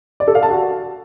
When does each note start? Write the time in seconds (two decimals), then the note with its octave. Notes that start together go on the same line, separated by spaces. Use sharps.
0.20 D5
0.28 A4
0.35 F5
0.43 A5
0.50 F#4